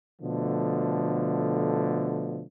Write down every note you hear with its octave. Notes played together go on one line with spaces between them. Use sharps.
B2 D3 F3 A3